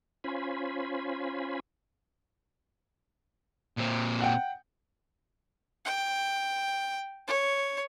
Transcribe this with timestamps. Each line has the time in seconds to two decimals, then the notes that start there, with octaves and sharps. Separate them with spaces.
0.24 C#4 F4 C5 G#5 B5
3.78 A#2 C4
4.20 F#5 G5
5.85 G5
7.27 C#5